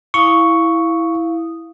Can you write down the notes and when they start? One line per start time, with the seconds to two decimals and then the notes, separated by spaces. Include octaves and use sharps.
0.14 E4 F5 C#6 D#6